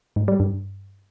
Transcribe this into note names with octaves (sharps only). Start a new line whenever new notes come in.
G#2
G3
G2